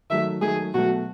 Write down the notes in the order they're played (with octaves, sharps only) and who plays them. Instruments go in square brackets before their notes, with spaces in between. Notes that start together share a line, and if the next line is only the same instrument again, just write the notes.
[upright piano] D#3 F#3 A3 [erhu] E5
[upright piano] D#3 F#3 A3 [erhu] G#4
[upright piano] B2 F#3 A3 [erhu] F#4